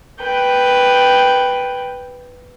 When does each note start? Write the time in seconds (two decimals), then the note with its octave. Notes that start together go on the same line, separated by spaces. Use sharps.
0.22 B4 G5